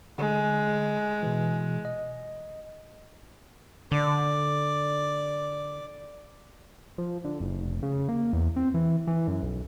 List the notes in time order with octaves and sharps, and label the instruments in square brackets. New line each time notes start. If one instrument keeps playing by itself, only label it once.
[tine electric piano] D3 [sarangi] G#3
[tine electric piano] B2 E3
D#5
[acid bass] D3 [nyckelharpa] D5
[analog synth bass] F3
D3
F#1
F1
C#3
A#3
E2
C4
E3
E3
F#2
B1